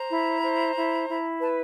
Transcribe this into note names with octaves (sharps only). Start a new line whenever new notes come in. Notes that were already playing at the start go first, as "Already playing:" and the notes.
Already playing: C5 A#5
E4
C5
E4
E4
B4 A5